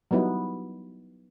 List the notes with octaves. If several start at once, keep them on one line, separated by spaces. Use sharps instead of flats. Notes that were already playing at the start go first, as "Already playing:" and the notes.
F#3 G3 B3 D#4 E4